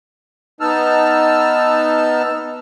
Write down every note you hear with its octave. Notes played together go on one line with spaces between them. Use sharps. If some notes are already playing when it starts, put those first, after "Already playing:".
B3 D#4 A5 E6 F6